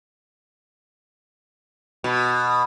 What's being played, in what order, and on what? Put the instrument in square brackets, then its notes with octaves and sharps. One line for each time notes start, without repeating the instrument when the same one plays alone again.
[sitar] B2